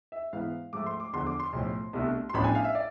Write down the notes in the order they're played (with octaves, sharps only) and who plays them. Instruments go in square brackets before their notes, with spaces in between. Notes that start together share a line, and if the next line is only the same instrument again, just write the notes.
[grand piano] E5
G#2 E3 B3 F5
G#2 F3 A3 D6
C6
D6
E2 D3 F3 C6
D6
C6
B1 A2 F3
C2 B2 A3 D4
C6
A1 A2 F3 B3 D4 B5
G#5
F5
E5
D5